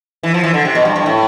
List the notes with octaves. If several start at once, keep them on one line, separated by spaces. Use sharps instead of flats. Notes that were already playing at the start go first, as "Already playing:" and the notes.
E3
F3
E3
D3
C3
B2
G2
G2
A2